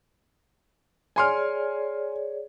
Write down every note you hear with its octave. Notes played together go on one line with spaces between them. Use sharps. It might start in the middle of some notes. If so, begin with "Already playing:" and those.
G#4 C#5 D5 G#5 C6 F6